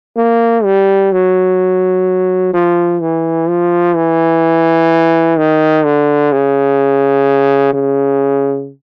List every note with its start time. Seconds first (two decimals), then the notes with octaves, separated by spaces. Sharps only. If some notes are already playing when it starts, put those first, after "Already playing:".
0.17 A#3
0.64 G3
1.12 F#3
2.54 F3
3.01 E3
3.49 F3
3.96 E3
5.38 D#3
5.85 D3
6.32 C#3
7.73 C#3